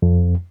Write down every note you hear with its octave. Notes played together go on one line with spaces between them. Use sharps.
F2